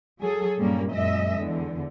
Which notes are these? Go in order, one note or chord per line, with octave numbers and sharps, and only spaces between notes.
F#3 G#4 A4
G2 A#2 G3 A#3 C#4
F#2 A#2 G#3 D#5 E5
E2 D3